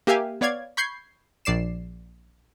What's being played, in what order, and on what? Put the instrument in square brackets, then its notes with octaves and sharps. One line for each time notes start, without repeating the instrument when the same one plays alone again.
[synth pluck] A#3 G4 E5 F5 G#5
B3 C#5 D5 F5 G#6
B5 C#6 G6 G#6 C7
A#1 D5 C7 E7